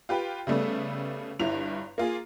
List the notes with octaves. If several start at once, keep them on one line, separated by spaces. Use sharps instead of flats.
F4 G4 B4 G5
C#3 G3 A3 B3
G1 G2 E4 F7
A#3 F4 G#4